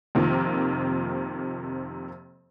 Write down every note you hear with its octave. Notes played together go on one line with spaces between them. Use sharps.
F2 C3 D#3 F3 A#3